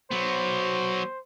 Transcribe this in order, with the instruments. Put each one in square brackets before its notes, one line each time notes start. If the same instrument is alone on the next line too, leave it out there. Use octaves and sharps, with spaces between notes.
[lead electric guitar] F#3 B3 [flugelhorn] C5